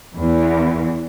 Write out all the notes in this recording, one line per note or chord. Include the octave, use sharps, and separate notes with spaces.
E2